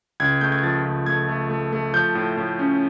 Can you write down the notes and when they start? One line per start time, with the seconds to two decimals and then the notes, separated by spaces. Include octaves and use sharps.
0.20 C#2 G#6
0.41 A3 G6
0.52 G#6
0.63 F3 A6
0.85 C#2
1.06 A3 G#6
1.29 A3
1.50 A3
1.73 A3
1.94 F3 G6
2.15 A2
2.37 A2
2.59 C#4